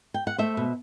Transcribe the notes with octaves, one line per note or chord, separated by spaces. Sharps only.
G5
F#5
A3 C5 E5
B2